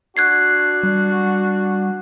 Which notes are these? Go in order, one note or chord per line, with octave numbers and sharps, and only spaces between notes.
D4 F#4 F#6 G#6 C7
G3